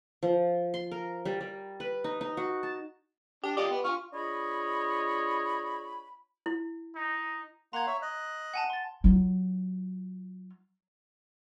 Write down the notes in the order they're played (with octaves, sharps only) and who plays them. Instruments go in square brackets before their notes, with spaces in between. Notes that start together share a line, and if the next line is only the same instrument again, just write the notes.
[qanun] F3
C6
A#4
G3
G3
B4
D#4
D#4
F#4
A5
[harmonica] D4 [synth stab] G4
[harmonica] F4 D5 D#5 [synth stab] G4
[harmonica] B3
[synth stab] F4 [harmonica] C#6 F6
[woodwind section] D4 F4 G#4 C#5 D#5 B5
[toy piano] E4
[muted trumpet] D#4
[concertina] A#3 F#5 C6 [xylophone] A#5 G#6
[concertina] C#5 E5
D#5 F#6
[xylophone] F#5 G#5 A5
C6 A6
[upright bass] F#3 F4